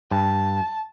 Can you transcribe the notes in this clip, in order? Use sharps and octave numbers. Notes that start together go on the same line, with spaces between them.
G2 A5